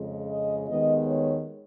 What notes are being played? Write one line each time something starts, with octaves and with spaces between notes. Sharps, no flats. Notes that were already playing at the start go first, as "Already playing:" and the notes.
Already playing: F2 C#3 G#3
D#5
D#2 D#3 G#3 B3 D#5
C#5